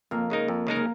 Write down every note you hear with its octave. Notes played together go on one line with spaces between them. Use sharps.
F2 A#3
C#3 G#3 D#4 A#4
F2
C#3 G#3 D#4 A#4
A#3